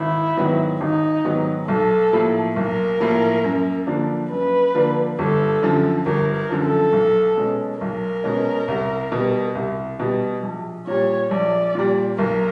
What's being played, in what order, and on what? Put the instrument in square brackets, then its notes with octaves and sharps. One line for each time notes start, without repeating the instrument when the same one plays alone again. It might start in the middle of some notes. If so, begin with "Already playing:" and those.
Already playing: [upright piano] G#1 [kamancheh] E4
[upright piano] G#2 D#3 F#3 B3
[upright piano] G#1 [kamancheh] D#4
[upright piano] G#2 D#3 F#3 B3
[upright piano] B1 [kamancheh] A4
[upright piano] A2 F3 A#3
[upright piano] B1 [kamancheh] A#4
[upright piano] A2 F3 A#3
F#2
D3 F3 A#3 D4
[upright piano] F#2 [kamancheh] B4
[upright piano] D3 F3 A#3 D4
[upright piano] G1 [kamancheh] A4
[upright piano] F#2 D3 F3
[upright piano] G1 [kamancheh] A#4
[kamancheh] A#4
[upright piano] F#2 D3 F3
[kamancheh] A4
[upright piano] B1
B2 G#3 C#4
[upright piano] B1 [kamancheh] A#4
[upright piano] B2 G#3 C#4
C2
B2
G3
C2
B2 G3
A#1
[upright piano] A#2 G3 [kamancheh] C#5
[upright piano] A#1 [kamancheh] D5
[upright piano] A#2 G3
[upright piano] B1 [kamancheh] A#4